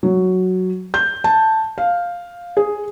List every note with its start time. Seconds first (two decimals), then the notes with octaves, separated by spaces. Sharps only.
0.03 F#3
0.94 G6
1.24 A5
1.78 F5
2.57 G#4